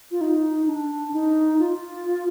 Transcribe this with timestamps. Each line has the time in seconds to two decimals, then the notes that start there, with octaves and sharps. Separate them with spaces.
0.11 F4
0.21 D#4
0.67 D4
1.13 D#4
1.59 F4